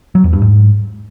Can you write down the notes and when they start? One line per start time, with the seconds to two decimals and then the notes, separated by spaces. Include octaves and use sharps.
0.15 F#3
0.24 E2
0.33 G2
0.42 G#2